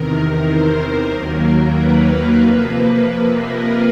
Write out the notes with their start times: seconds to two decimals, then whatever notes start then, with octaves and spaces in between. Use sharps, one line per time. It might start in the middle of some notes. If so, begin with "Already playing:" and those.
Already playing: E2 C3 D#3 A#4
0.46 C5
1.10 D#2 D#3 F#3 A#3 A#4
1.75 B4
2.06 B4
2.38 F2 C3 F3 A#3 B4
2.71 B4
3.03 B4
3.35 A#4